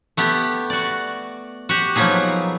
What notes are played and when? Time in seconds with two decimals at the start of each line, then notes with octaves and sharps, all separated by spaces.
0.17 A3 B3 G4
0.70 F#4 D5
1.69 F#4 G4
1.96 F3 F#3 A#3 B3 D#4 G#4